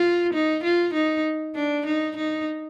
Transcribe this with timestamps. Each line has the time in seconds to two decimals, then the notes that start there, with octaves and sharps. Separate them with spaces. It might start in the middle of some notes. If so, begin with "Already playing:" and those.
Already playing: F4
0.33 D#4
0.63 F4
0.94 D#4
1.55 D4
1.86 D#4
2.17 D#4